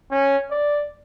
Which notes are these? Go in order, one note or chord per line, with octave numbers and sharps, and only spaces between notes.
C#4
D5